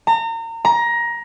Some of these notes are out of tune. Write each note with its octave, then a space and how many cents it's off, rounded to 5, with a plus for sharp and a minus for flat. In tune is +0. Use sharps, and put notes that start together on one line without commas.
A#5 -35
A#5 +20